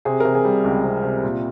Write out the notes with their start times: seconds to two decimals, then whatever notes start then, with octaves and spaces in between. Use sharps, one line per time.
0.05 C3 G#4
0.20 C3 A#4
0.35 G#4
0.45 G3
0.64 C#2
0.84 C3
1.03 C3
1.23 A#2